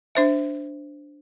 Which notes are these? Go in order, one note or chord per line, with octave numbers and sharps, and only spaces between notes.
D4 C5 E5